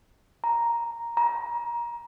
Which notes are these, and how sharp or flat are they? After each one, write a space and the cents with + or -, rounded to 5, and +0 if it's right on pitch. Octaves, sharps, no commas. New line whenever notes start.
A#5 +5
A#5 +25